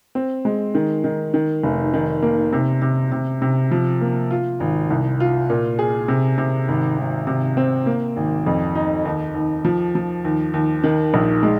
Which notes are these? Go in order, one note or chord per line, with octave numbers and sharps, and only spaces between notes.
C4
G#3
D#3
D#3
D#3
F1
D#3
A#3
C3
C3
C3
C3
F3
A#3
F4
G#1
C2
F4
A#2
G#4
C3
C3
G#1
G#1
C3
C4
A#3
G#1
F2
D#4
D#2
D#2
F3
F3
D#2
D#2
D#3
A#1
G#3